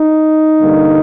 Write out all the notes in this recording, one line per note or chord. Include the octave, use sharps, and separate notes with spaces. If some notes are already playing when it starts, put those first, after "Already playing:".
Already playing: D#4
G2 D3 G3 A#3